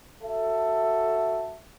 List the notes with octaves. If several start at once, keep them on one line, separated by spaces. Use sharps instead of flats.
F#4 A4 E5